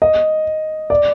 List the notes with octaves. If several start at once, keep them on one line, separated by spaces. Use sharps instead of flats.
D#5
D5